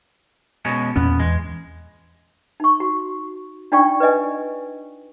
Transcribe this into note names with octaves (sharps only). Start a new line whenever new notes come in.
B2 G#3 C#4
E2 A#2 B3 C#4
E2 G#3
D#4 C#6
F#4
D4 D#4 F4 D5 G5 C#6
B4 D5 D#5 G#5